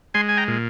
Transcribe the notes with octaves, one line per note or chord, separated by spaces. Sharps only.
G#3 G#5 C6
G#5
G5 A#5
A#2